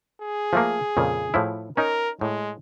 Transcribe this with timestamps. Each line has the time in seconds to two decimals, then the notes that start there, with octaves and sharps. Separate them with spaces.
0.22 G#4
0.53 F3 A3 A#3
0.97 F2 A#2 C#3
1.34 A2 F3 E4
1.77 C#4 D#4 A#4
2.21 A2 G#3